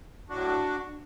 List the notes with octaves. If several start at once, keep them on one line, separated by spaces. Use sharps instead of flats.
A2 F#3 D4 F#4